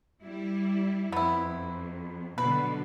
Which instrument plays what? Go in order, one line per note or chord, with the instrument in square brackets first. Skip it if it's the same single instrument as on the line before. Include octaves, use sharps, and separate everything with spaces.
[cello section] G3 E4
[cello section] F2 [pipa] B3 E4
[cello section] B2 D3 F#3 [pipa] B4